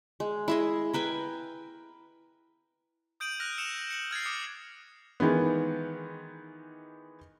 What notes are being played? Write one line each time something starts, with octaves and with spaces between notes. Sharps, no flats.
G#3
E4 G#4 D#5
A#4 B4 G5 G#5
D#6 G6 D7 D#7 F#7
F6 F#6 A#6 F7
E6 C#7 E7 F7
C#7 F#7
F6 G#6 A6 C7
D6 D#6 C#7
D#3 E3 G#3 B3